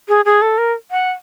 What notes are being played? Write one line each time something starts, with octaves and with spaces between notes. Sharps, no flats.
G#4
G#4
A4
A#4
F#5